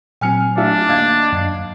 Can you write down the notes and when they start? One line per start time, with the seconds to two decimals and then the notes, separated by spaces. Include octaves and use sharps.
0.21 A#2 F#3 C4 G#5 F6 C#7
0.57 A3 D4 F4 E5
0.89 D#2 D#5 F5 G#6
1.32 F#2 D#5 C7